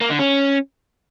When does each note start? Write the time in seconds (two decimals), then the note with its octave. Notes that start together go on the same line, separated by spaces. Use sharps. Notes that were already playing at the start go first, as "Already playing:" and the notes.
0.01 A#3
0.10 D3
0.19 C#4